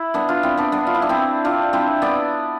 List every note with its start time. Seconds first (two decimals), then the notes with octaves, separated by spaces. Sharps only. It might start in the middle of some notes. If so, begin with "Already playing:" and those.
Already playing: E4
0.14 B3 D4
0.29 D4 F4
0.43 C4 E4
0.57 B3 D4
0.72 B3 D4
0.87 F4
0.94 E4
1.02 D4
1.09 C4 E4
1.44 D4 F4
1.73 C4 E4
2.02 B3 D4